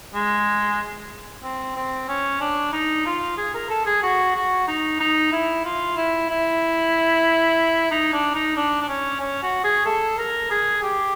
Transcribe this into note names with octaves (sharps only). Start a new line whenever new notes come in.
G#3
C4
C4
C#4
D4
D#4
F4
G#4
A#4
A4
G#4
F#4
F#4
D#4
D#4
E4
F4
E4
E4
D#4
D4
D#4
D4
D4
C#4
C#4
F#4
G#4
A4
A#4
G#4
G4